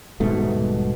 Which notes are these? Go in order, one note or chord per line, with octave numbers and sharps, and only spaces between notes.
D#1 G#2 B2 A3